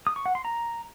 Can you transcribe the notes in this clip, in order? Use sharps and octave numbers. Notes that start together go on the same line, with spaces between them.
D#6
C#6
F#5
C6
A#5